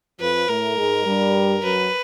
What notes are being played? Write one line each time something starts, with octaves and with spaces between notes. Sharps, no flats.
F2 F3 B4
A2 A3 A#4
G#2 G#3
G2 G3
F#2 F#3 B4